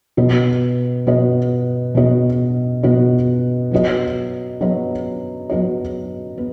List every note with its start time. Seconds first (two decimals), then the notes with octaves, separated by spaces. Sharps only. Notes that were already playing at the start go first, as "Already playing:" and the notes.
0.17 B2 B3 F#4 D#5
1.07 B2 B3 F#4 D#5
1.95 B2 B3 F#4 D#5
2.83 B2 B3 F#4 D#5
3.72 F#3 B3 F#4 D#5
4.61 F#3 B3 F#4 D#5
5.50 F#3 B3 F#4 D#5
6.38 B3